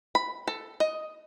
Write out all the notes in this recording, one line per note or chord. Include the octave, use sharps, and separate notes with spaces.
B5
A4
D#5